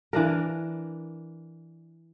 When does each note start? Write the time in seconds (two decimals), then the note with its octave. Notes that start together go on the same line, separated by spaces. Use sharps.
0.13 E3 D4 A#4